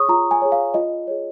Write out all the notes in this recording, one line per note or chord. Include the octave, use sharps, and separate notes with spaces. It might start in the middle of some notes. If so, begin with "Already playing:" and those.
Already playing: G#4 C#5 C#6 D#6
F4 A#5
G#5
G#4 C#5
F5
F4 D#5
G#4 C#5